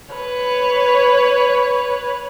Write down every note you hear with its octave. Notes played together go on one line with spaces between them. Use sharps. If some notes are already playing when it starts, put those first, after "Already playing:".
B4 C#5